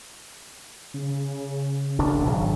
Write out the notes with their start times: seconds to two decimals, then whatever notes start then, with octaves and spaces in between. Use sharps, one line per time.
0.94 C#3
1.99 E1 D2 D4
2.25 G#1 B2 F#3